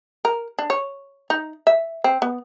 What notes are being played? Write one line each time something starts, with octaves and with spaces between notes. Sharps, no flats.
A#4
D4
C#5
D#4
E5
C4
B3